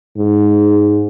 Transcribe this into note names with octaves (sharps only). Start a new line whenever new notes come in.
G#2